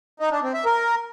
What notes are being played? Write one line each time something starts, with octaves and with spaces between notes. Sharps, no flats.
D#4
D4
C4
E5
A#4